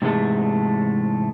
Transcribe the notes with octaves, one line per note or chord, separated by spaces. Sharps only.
G#2 C3 E3 G#3 A3